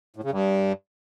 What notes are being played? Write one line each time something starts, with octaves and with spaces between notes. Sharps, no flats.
A2
C#3
G2